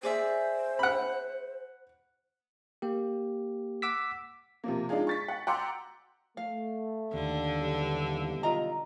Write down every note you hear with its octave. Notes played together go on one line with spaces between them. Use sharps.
G#4 C5 D5 E5
F#5 B5
A#3 G4
F#5 D6 E6 B6
C3 F3 A#3
G#3 D4 D#4 F4 G#4
C#6 A6 B6
F#5
F#5 G5 A#5 C6 D6 E6
A3 F5
D#2 D3
B1 E3 G3
F4 D#5 A#5